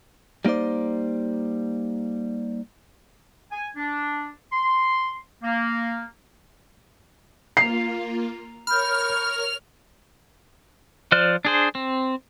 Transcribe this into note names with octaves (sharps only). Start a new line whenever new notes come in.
G3 A#3 D#4 C5 D5
G#5
D4
C6
A#3
A#3 F4 A#5 C7 F7
A#4 C#5 B5 F6 G6
F3 C5 D5 F6 F#6
D4 G#4 C5
C4